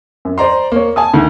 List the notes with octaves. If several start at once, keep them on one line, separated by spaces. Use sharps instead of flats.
F#2
C5 D5 A#5 C6
A#3 C#5
G#5 A5 D#6
D2 D#3